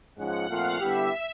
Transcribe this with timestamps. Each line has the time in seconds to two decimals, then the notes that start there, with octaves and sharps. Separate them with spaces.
0.18 G#2 F3 G#3 C#4 F4 F#5
0.48 A#2 F3 A3 C4 F4 F5
0.79 D3 G3 B3 E4 G4 E5